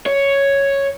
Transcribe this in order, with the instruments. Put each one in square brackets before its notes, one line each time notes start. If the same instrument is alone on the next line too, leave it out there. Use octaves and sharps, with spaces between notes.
[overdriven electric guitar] C#5